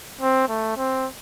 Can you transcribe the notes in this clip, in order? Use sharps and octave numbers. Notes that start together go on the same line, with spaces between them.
C4
A3
C4